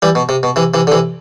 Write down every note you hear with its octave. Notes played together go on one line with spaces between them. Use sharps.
E3 G3
B2
C3
B2
C3 E3
C3 E3
D3
C3 E3